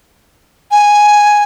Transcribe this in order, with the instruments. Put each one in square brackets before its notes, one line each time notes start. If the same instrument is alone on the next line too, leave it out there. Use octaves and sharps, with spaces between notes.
[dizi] G#5